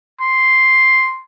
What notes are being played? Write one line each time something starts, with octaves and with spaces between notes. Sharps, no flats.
C6